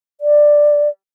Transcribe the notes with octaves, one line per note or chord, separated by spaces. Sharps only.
D5